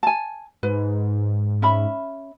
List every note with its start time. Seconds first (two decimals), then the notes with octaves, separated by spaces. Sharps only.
0.03 G#5 A5
0.63 G#2 B4
1.62 C#4 E5 B5